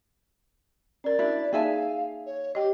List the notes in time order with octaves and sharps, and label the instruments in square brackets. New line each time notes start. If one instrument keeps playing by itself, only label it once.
[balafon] C#4 A#4 [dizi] D5
[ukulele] D4 E4 [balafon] F#4
[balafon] A#3 D#4 A5 [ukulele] G#4 E5 G#5 [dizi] F5
[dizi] C#5
[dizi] G4 [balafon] D#5 G5